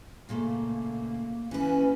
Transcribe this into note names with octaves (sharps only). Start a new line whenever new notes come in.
A#2 C#3 A3 A#3
E3 C#4 B4